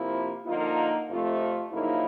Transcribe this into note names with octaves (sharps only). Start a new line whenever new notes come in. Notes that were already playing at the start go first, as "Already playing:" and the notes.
Already playing: C3 F3 A#3 E4
D3 F3 A#3 D#4 F4
F2 C3 F3 A3 F4
F4
F#2 C#3 F3 A#3 D#4 E4